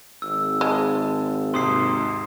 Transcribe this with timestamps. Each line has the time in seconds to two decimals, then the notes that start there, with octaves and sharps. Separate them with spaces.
0.22 G#1 E6
0.61 G#3 A5
1.54 D#2 G#2 C3 C6 D#6 C7